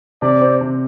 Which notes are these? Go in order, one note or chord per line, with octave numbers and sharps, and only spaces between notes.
C3 D5
C4
C3